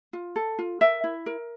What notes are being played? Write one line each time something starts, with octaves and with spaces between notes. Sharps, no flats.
F4
A4
F4
A#4 E5
E4
A#4